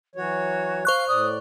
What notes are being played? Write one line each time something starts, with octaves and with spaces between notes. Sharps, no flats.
E3 F#3 F#4 C#5
C5 F5 C#6 F#6
A2 D5 D#6